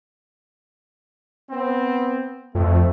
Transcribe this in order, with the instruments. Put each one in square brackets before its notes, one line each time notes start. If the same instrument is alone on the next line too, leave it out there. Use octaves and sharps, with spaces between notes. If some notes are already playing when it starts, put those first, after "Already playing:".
[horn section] B3 C4
[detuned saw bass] F2 [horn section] A3